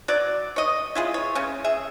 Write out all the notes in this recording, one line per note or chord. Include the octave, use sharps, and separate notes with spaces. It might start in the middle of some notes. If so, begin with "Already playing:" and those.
F#3 D5
C#5 D#5
E4 F4 G#4
C#5
C#3 C#4
G#4 E5